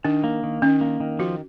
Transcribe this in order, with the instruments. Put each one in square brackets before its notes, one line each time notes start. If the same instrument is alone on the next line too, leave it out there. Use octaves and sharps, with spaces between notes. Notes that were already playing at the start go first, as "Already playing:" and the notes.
[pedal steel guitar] D#3 [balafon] D4
[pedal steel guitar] A#3
D#3
[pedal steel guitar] D#3 [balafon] C#4
[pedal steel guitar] A#3
D#3
[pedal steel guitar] F3 [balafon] F#4